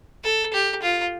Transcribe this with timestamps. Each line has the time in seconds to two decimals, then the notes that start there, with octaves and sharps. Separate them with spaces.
0.24 A4
0.53 G4
0.82 F4